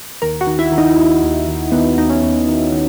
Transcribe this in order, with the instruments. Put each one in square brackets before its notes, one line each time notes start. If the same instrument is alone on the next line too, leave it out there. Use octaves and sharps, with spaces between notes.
[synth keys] D#2 A#4
F#4
D#3
E4
D#3
D#4
D#2
D#2
D#3
D#3 B3
D#2 D#4
C#4
D#2
D#3
D#3